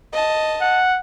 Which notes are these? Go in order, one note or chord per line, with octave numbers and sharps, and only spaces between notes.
D#5 A5
F#5